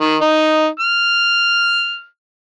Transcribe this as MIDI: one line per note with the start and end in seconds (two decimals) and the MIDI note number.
0.01 0.16 51
0.21 0.67 63
0.80 2.06 89